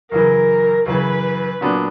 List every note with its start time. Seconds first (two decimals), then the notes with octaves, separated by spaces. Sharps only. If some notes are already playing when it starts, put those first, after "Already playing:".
0.11 F#2 C#3 E3 A#4
0.86 F#2 C#3 E3 B4
1.61 A#2 F#3 B3 D4